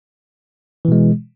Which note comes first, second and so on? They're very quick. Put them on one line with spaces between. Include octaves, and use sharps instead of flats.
E3 B2 G#3